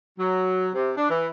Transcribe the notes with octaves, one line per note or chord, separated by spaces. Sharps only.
F#3
C3
D4
E3